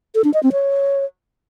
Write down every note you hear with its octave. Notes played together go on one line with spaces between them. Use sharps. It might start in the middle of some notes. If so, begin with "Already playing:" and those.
A4
D4
D#5
C4
C#5